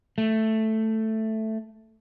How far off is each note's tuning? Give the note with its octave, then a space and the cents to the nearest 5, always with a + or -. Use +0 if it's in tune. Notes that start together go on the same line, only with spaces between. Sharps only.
A3 +0